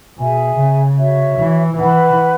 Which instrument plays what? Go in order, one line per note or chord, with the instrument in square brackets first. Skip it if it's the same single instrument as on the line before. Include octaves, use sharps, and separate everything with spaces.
[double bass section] B2 [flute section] G#4 E5 G#5
[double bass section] C#3
[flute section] F#4 C#5 E5
[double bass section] E3
[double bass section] E3 [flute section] B4 F#5 B5